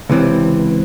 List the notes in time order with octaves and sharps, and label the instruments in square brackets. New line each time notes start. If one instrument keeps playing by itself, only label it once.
[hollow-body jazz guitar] C#2 C3 E3 C4